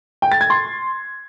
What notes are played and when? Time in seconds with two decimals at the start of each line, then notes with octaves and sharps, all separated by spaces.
0.22 G5
0.32 A6
0.41 G#6
0.50 C6